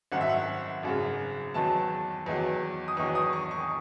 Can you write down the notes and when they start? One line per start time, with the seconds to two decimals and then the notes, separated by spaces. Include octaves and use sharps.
0.12 G#1 F#2 D#3 F#5
0.21 E5
0.29 F#5
0.83 G#1 F#2 C#3
1.54 E2 D#3 F#3 A5
2.26 E2 D#3 F#3
2.88 D#6
2.97 E2 D#3 F#3 C#6
3.15 D#6
3.33 C#6
3.51 C#6